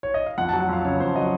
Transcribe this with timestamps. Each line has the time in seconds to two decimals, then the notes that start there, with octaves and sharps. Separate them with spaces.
0.03 C#5
0.14 D#5
0.26 F5
0.38 F2 F#5
0.49 F#3 A5
0.60 F#5
0.69 F2 F5
0.84 C#3 C#5
1.00 F2 C5
1.16 F#3 D#5